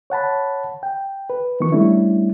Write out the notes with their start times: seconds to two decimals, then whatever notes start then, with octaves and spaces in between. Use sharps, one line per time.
0.10 C#5 F#5 A5 B5
0.83 G5
1.30 B4
1.60 D#3 F3 B3 C#6
1.72 G3 A3 C#4 D4 E4